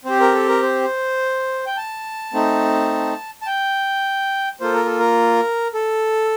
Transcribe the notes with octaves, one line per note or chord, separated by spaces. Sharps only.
C4 G4 C5
A#4
A4
A#4
C5
G5
A5
A3 C4 D#4
A5
G5
A#3 F4 A4 C5
A#4
A4
A#4
A4